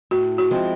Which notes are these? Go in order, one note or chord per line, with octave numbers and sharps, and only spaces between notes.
A2 F#4
F#4
F3 G#3 C4 E4